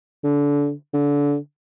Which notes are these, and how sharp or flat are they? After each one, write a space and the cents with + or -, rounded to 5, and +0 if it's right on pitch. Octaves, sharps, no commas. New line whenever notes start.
D3 -25
D3 -25